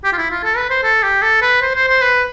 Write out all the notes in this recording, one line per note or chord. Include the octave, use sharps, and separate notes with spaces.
G4
F4
E4
F4
A4
B4
C5
A4
G4
A4
B4
C5
C5
C5
B4